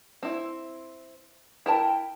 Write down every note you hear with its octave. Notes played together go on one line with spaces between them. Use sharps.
C4 E4
E4 A#4 G5 A5